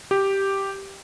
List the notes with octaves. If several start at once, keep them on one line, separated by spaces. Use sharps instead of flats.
G4